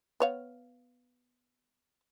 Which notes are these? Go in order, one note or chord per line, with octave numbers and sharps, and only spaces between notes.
B3 C#5 F5